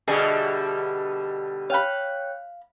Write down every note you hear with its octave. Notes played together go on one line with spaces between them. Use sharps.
B2 D3 G3 G#4 D#5 E5
C#5 F5 G5 B5 F#6